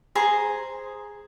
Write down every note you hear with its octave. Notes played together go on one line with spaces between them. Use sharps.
G#4 C5 A#5